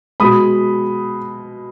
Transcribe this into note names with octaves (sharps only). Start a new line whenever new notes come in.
B2 G#3 B5 D#6